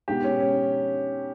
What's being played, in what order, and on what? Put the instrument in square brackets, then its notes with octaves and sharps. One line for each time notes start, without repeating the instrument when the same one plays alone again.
[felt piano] B2 G#3 B3 D#4 [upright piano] G4
[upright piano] C#4
C#4